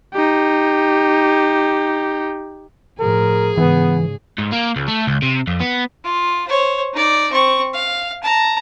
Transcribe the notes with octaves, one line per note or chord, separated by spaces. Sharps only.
D#4 G4
A2 F3 G#4 A#4
G#2 C#3 E3 B3
G#2
A#3
C#2
A3
C#2
C3
F2
B3
F4
C5 C#5
D#4 D5
C4 C#6
F5
A5 A#5